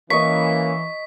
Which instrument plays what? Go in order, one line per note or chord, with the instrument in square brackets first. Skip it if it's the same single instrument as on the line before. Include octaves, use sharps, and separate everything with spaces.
[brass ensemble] E3 [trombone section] A#3 C#4 [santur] D#5 C#6 [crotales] B6